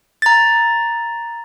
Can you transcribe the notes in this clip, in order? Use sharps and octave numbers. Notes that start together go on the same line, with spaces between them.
A#5 A6